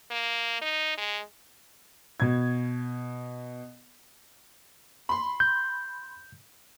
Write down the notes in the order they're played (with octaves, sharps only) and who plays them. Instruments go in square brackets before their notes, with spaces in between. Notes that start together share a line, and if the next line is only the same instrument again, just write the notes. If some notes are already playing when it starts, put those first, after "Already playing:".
[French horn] A#3
D#4
G#3
[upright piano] B2 G#6
[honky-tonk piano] B5 C6
[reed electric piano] G6